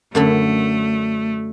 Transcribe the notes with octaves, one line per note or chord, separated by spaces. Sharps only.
F#2 D3 A3 B5